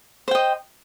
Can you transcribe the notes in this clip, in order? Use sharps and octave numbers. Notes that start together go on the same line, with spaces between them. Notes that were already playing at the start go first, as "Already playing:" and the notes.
C5 D#5 G5